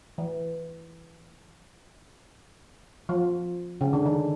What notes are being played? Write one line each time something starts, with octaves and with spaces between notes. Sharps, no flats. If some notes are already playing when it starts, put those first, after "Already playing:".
E3
F3
C#3
D3
D#3